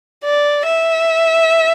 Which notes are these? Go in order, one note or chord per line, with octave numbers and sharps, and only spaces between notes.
D5
E5